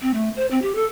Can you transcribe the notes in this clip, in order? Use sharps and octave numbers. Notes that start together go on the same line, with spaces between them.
C4
A3
C5
C4
G4
A4